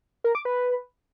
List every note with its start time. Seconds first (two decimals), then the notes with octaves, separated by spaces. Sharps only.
0.24 A#4
0.35 D6
0.45 B4